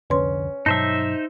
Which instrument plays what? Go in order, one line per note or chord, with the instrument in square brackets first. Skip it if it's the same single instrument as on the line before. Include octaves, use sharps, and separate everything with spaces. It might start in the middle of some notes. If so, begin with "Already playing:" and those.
[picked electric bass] C2 F2 D3 [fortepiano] C#4 [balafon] B4 C6
[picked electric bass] G2 B2 F#3 [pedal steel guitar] D#4 C5 E5 [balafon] A5